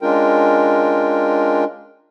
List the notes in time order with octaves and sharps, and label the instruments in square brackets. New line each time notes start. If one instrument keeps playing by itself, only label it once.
[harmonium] G#3 C#4 D4 F4 A#4 G5